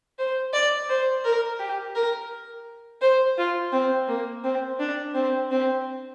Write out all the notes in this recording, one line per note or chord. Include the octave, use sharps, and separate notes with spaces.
C5
D5
C5
A#4
G4
A#4
C5
F4
C4
A#3
C4
D4
C4
C4